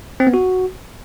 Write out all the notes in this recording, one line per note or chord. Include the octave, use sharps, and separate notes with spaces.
C4
B3
F#4